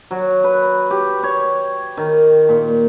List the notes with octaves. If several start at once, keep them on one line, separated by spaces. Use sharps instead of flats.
F#3
B4
G4
C#5
D#3
A#2